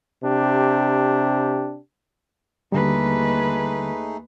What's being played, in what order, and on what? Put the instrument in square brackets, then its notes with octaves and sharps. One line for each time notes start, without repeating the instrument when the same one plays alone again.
[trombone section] C3 D4 G4
[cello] D#2 B4 [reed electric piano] D3 G3 [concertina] A3 D#4 G#4